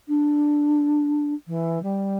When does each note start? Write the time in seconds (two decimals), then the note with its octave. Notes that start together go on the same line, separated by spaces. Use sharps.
0.08 D4
1.47 E3
1.82 G3